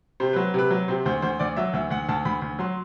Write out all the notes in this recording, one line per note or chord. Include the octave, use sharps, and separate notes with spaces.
C3 C5
F#3 B4
C3 B4
F#3
C3 C5
D2 C5
D2 C5
D2 D5
F#3 E5
D2 E5
D2 F#5
D2 A5
D2 B5
D2
F#3 C6